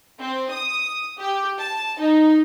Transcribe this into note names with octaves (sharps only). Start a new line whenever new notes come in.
C4
D#6
G4
A5
D#4